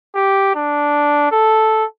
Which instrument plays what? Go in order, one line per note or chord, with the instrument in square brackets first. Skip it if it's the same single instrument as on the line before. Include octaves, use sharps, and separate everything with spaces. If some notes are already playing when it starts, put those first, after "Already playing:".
[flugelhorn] G4
D4
A4